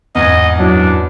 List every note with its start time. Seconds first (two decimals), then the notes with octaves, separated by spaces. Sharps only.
0.15 E2 G#2 D#5 G#6
0.58 F#2 F#3 D4 E4